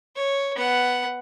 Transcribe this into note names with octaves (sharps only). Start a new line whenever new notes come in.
C#5
B3 F#5